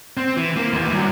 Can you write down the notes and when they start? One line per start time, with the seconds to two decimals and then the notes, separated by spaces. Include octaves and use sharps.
0.17 C4
0.36 E3
0.57 A#3
0.73 D#2 E3
0.92 G2 F#3